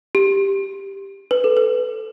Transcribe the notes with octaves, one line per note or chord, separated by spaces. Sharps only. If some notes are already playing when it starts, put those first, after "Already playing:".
G4
B4
A4
B4